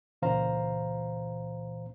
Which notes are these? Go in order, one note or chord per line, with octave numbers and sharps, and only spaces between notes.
C#2 A#2 E3 C5 F5 A#5